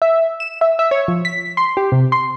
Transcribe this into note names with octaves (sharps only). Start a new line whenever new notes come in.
E5
E7
E5
E5
C#5
F3
B6
C6
G4
C3
C6